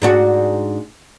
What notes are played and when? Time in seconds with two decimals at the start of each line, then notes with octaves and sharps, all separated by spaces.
0.02 G#2 D4 F#4